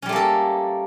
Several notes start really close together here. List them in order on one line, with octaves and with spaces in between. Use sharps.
C#4 G3 A3 A#3 A4